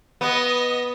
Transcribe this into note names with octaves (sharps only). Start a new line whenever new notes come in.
B3 D#5